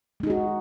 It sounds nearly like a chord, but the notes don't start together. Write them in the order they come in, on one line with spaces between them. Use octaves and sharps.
G#3 D#4 G#4 F#4